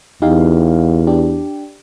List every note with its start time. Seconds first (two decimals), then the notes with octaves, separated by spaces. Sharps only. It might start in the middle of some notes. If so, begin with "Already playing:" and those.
0.22 E2 D#4 G4 F5
1.07 D4 G4